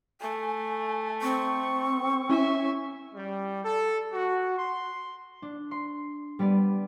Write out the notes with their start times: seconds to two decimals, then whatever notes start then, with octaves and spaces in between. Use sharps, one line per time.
0.21 A3 G#5
1.22 C4 C#6
2.30 C#4 E4 E5 G#5
3.15 G3
3.64 A4
4.12 F#4
4.57 C6
5.42 D4
5.71 C6
6.39 G3 B3 B4 D5